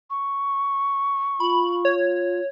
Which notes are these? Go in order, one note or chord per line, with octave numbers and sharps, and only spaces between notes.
C#6
F4 B5
C#5